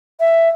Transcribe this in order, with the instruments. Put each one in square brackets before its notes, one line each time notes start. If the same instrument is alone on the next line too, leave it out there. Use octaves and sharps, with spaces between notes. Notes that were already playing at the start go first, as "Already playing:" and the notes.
[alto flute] E5